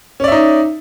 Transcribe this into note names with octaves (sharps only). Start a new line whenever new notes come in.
C#4 D#4 D5 E5